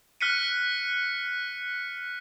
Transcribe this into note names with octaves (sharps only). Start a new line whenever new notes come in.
F6 F#6 B6 C#7 D#7